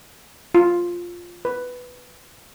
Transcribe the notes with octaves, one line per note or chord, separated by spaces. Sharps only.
F4
B4